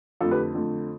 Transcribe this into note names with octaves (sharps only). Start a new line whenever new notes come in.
F2 D3 A3 F4 A4
G4 B4
F2 D3 A3